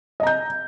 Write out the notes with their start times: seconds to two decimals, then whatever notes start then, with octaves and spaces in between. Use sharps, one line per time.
0.20 D#5
0.23 A#5
0.27 G6